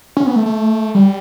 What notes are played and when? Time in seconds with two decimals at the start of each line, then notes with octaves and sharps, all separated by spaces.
0.17 C#4
0.26 B3
0.36 A3
0.46 A3
0.95 G3